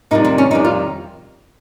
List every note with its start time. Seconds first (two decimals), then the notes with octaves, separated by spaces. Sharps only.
0.11 F2 C3 D#3 G3 D#4
0.25 C4
0.38 C#4
0.51 F2 C3 D#3 G3 D#4
0.65 F4